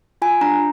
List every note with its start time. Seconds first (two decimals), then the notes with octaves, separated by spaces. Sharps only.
0.22 F4 G#5
0.41 D4 A#5